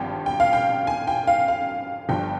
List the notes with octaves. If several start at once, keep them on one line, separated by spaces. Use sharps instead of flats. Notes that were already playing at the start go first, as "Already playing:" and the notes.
Already playing: G#1 G2 F3 G5
G5
F5
G5
G#5
G5
F5
F5
G1 G2 F3 G5